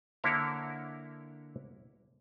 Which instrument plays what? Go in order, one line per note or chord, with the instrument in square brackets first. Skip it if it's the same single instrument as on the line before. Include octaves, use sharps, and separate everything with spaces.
[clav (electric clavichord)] D3 A#3 E4 C#5